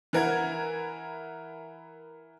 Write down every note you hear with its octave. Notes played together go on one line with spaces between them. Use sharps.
E3 A#4 F#5 G#6